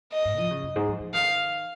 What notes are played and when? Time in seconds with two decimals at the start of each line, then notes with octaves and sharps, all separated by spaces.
0.13 D#5
0.25 G#2
0.38 F3
0.50 C#3
0.63 F#2
0.76 G#2
0.88 F3
1.00 F3
1.14 D#3 F5